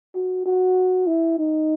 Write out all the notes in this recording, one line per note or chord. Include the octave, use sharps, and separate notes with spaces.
F#4
F#4
E4
D#4